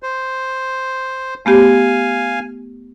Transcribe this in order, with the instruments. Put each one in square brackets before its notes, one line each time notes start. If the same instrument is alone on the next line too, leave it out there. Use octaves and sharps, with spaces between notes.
[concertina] C5
[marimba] A3 B3 G4 [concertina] F5 G#5